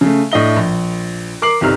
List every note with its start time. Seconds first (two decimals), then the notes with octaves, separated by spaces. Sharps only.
0.01 C#3 A3
0.32 A2 D4 D#5 G7
0.56 A#1
1.42 A#4 D6 C7 F#7
1.61 G1 C2 C3 D#4 F6